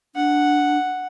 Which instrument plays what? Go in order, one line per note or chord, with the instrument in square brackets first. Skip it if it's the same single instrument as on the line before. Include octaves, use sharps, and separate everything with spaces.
[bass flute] D4 [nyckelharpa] F#5